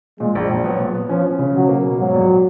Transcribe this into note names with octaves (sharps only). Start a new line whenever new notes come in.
A#2 G#3
A#1
A#1
F#3 B3
A#2
B3
F3 C#4
C#4
C#3
B2 F#3
A#3
B2
G#2 F#3
A#1